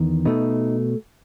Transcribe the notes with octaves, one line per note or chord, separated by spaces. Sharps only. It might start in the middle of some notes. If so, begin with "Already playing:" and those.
Already playing: E2 D#3
B2 A3 D#4